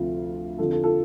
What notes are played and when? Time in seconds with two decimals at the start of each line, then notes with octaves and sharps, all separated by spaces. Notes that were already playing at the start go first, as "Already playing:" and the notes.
Already playing: D2 C3 F3 F4
0.58 F2 D3 F3 F4 A4
0.71 F4 A4
0.84 F4 A4